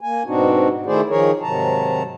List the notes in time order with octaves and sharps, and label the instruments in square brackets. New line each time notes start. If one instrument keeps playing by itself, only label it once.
[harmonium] A#3 G#5
G#2 B2 C4 D4 D#4 F#4
D#3 A3 E4 G#4 C5 D5
D#3 F3 G#4 A#4 C#5
G#2 C3 D#3 F#3 A5 A#5